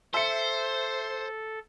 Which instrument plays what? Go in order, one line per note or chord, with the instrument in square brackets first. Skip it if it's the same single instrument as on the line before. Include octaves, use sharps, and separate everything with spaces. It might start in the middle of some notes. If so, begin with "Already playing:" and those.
[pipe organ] A4 [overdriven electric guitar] C5 [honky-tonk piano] E5 C#7